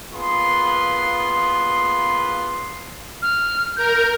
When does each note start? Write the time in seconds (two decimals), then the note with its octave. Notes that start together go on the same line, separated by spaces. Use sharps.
0.13 A#3 B3 F4 G#4 B4 C6
3.22 F6
3.77 A#4 G6